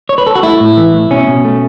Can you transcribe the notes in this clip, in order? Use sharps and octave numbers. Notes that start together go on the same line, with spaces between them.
C#5
B4
A4
F#4
A3 E4
A2
E3
A2
B2 C#4
B2
A3